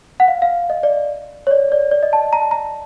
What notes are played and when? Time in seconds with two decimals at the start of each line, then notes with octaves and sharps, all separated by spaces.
0.20 F#5
0.28 F5
0.42 F5
0.70 D#5
0.83 D5
1.47 C#5
1.51 D5
1.72 D5
1.91 D5
2.03 D#5
2.13 A5
2.33 A#5
2.42 A5
2.51 A#5